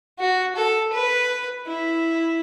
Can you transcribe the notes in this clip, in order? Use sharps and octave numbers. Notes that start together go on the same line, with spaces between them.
F#4
A4
B4
E4